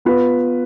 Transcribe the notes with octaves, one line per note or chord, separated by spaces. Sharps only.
B3 F4 B4